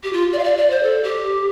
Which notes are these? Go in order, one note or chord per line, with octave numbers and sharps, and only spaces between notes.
G4
F4
D5
F5
D5
D5
C5
A4
G4